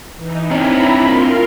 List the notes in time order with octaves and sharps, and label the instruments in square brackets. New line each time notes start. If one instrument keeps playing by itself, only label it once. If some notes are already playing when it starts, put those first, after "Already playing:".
[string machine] E3 D#4
[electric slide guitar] C4 D4 C#5 [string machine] E4 A#5 B5
[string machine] F4 A#4 C6